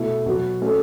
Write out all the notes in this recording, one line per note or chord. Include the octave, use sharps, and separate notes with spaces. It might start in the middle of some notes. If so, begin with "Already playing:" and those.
Already playing: B2 A3 E4
B2 F#3 B3 F#4
A3 C#4 F#4 A4